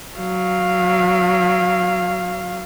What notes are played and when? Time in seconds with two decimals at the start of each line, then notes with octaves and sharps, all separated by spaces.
0.17 F#3 F5